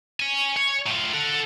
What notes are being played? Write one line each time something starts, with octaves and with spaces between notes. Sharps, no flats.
C#5 G#5
C#5
A2 F4
A4 F#5